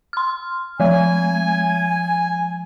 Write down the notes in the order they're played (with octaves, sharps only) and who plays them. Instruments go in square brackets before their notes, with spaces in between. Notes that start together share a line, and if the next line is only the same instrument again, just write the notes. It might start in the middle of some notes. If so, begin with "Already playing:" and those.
[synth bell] C6 F6
[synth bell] F3 G#3 [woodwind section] G#5